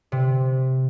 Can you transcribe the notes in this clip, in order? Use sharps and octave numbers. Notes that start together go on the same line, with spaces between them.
C3